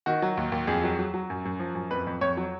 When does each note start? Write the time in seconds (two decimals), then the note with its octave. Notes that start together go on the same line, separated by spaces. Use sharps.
0.06 D#3 F#4
0.22 F#3
0.37 D#2
0.52 D#2
0.67 F2 G#4
0.84 F#3
0.99 F#3
1.14 F#3
1.30 F#2
1.45 F#2
1.59 F3
1.75 F#2
1.91 F2 B4
2.07 F2
2.21 F2 C#5
2.37 F#3